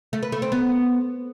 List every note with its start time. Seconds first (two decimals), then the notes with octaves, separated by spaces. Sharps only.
0.13 A3
0.23 B4
0.32 A3
0.42 C4
0.52 B3